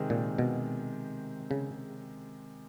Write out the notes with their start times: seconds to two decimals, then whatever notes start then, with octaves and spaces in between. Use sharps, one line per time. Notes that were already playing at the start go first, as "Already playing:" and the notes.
Already playing: C3 D#3 G#3 C4
0.10 A#2
0.38 B2
1.51 C#3